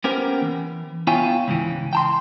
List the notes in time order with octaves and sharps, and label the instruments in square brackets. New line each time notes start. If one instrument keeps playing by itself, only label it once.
[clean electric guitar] A#3 B3 C#4 G4 A#4 C5
E3
B3 E4 F4 C#5 G5 G#5
C#2 G#2 E3
G5 A5 C6